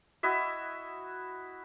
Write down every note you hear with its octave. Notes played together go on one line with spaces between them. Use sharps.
E4 F#4 D#5 E5